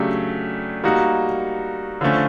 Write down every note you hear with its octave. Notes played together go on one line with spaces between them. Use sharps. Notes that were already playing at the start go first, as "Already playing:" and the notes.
Already playing: C#3 F#3 A3 D4 G4
G3 A#3 D#4 F#4
D3 F3 A3 C#4